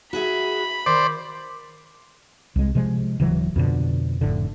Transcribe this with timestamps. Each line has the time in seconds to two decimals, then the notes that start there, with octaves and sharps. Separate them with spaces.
0.13 F#4 G#4 E5 B5
0.86 D#3 C5 D5
2.56 C2 G#3
2.75 C3 F3 G#3
3.20 D1 C#3 E3 F#3
3.56 F2 B2 D3
4.21 F1 A2 D3